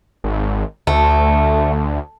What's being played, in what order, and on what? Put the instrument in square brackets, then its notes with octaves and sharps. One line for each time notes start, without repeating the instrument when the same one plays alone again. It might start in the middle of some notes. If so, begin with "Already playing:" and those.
[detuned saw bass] G#1
[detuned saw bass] D2 [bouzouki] A3